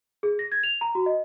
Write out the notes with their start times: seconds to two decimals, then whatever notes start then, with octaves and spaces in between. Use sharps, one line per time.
0.23 G#4
0.39 A#6
0.52 G#6
0.63 F7
0.81 A#5
0.95 F#4
1.06 D#5